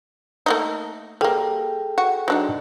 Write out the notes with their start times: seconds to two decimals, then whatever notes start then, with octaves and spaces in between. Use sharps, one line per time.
0.46 A3 A#3 D#4
1.21 G3 A#3 G#4 A4 G5
1.98 F#4
2.28 F#3 D4 D#4